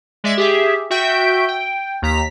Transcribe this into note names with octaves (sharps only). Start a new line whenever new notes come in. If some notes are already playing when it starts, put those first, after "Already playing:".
G#3 D5 E5 A6
G4 G#4 E5
F#4 E5 G5 G6
G5
D#2 A#5 B6